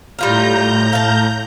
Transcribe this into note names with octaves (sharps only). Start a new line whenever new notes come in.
A2 G3 F4 A#4 A#5 G6
F5 A5